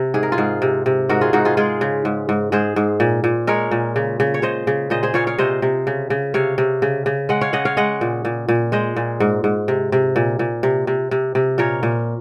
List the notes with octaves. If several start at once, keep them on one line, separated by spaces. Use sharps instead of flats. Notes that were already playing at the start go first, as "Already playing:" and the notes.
Already playing: C3
G#2 G#4
A#4
F4 G#4
G#2
C3
C3
G#2 F#4 A#4
F4 G#4
G#2 D#4 F#4
F4 G#4
G#3 F4 G#4
C#3
G#2
G#2
G#2 G#4 C5
G#2
A#2
A#2
G#3 A#4 C#5
A#2
C#3
C#3
C#5
C#3 C5 D#5
C#3
A#2 C5 D#5
G#4 C5
A#2 C#5 F5
C#5 F5
C3 C5 D#5
C3
C#3
C#3
C3 C#5 F5
C3
C#3
C#3
G#3 D#5 F#5
C#5 F5
C#3 D#5 F#5
C#5 F5
G#3 D#5 F#5
A#2
A#2
A#2
G#3 C5 D#5
A#2
G#2
G#2
C3
C3
A#2
A#2
C3
C3
C3
C3
A#2 A#4 C#5
A#2